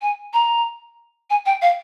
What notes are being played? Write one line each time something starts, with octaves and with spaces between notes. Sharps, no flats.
G#5
A#5
G#5
G5
F5